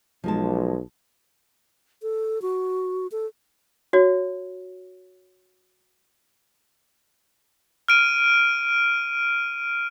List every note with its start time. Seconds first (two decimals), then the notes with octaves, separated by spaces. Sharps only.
0.24 B1 F3 G#3 A5
2.02 A4
2.42 F#4
3.12 A4
3.93 F#4 C#5
7.88 F6 D7 D#7